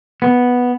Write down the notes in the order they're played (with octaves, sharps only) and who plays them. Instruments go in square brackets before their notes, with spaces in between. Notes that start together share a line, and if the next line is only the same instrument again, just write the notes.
[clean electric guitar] B3